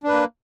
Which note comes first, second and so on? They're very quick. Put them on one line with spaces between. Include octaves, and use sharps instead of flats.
D4 B4 A#3